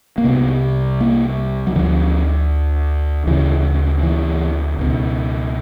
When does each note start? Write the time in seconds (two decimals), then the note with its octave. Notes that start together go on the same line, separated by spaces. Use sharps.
0.18 A#3
0.24 C2 C3 B3
1.00 A#3
1.67 F#3
1.75 D2 D3 F3
3.27 D2 C#3 E3
4.03 E3
4.79 C#2 B2